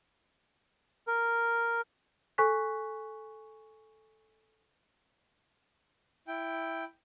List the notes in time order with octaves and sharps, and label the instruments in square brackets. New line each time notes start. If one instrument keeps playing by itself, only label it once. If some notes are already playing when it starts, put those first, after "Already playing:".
[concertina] A#4
[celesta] A4 G#5 C#6 F#6 B6
[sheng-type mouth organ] E4 G5